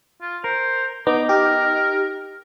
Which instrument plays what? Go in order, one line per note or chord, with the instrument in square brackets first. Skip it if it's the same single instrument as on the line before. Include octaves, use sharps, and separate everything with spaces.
[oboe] F4
[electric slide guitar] A#4 [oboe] C5
[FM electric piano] B3 [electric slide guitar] D#4 [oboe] D6
[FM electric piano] G4 [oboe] A#4